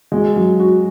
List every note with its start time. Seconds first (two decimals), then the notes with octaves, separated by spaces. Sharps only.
0.12 G#3 F#4
0.36 F#3
0.59 F#4